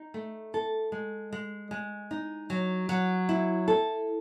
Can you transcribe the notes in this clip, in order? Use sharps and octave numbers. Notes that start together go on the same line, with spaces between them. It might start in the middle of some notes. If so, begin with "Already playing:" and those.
Already playing: D#4
A3
A4
G#3
G#3
G#3
D#4
F#3
F#3
E4
A4